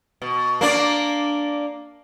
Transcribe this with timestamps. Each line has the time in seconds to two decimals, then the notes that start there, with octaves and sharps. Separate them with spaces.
0.22 B2
0.61 A#3 D4 D5